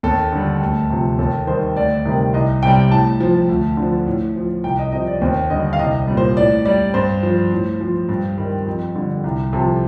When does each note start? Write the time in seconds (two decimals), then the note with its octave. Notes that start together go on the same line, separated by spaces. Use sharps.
0.03 D#2 A4
0.32 D3 G3
0.61 D2
0.90 C3 F3
1.18 D#2 A4
1.47 D#3 G3 C5
1.76 D2 D5
2.05 C3 D#3 G3
2.33 C2 D#5
2.63 C3 G3 G5
2.91 A2 A5
3.20 F3
3.49 D2
3.77 D3
3.82 F3
4.07 A2
4.36 F3
4.64 C2 G5
4.79 D#5
4.92 C3 F3 D#5
5.07 D5
5.21 D#2 C5
5.50 D3 G3 D#5
5.73 F5
5.79 C2 D#5
6.08 A#2 G3
6.17 C5
6.36 A2 D5
6.65 G3 D5
6.94 G2 C5
7.23 F3
7.51 A2
7.81 F3
8.09 G2
8.38 D#3 G3
8.66 F2
8.95 D3 G3
9.24 C2
9.53 C3 F3 A4